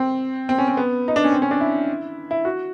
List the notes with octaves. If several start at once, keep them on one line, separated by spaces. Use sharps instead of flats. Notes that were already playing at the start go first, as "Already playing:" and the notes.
Already playing: C4
C4
C#4
C4
B3
D#4
D4
C#4
C4
C#4
D4
E4
E4
F#4